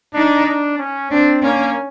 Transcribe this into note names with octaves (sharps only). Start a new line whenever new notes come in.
D4 D#4
D4
C#4
C4 D4
A#3 C#4